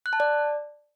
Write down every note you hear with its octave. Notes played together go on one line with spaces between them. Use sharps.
F#6
A5
D5